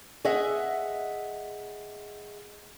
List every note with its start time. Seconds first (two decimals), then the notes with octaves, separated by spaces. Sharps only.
0.25 G#4 D#5 E5 F#5